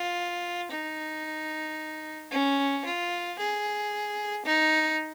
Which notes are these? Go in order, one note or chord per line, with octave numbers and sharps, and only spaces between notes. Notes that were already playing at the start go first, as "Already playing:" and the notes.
Already playing: F4
D#4
C#4
F4
G#4
D#4